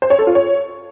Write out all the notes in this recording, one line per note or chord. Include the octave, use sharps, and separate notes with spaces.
C5
C#5
A4
F4
C#5